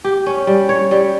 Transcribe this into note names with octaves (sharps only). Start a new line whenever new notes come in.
G4
C#4
G3
C#5
G3